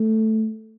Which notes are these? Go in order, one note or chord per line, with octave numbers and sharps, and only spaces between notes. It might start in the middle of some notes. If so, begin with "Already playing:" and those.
Already playing: A3